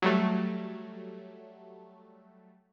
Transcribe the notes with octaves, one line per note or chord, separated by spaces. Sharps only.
F#3 G3 A3